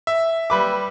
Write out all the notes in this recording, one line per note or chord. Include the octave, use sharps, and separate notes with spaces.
E5
G3 B4 D6